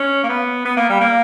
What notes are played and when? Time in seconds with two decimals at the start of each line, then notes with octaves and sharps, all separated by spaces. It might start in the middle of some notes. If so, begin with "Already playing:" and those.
Already playing: C#4
0.23 A#3
0.29 B3
0.65 B3
0.77 A#3
0.89 G3
1.01 A#3